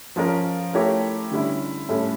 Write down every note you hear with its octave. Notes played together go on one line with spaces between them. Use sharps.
F3 C#4 F4 A#4
A3 E4 G4 A#4 C#5
D3 G3 C#4 E4
A2 G3 C#4 E4 A4